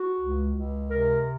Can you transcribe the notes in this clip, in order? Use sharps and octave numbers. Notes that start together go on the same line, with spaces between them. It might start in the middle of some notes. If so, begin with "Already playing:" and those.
Already playing: F#4
C#2
C#2
C3 A#4